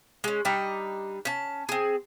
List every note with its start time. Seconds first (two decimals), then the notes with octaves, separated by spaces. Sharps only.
0.24 G#3 C#4
0.45 G3 D4 D#4 G5
1.25 C#4 A5
1.69 C4 G#4